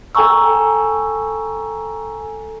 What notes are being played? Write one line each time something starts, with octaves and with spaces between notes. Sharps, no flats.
A4 G5 G#5 A#5 C#6 E6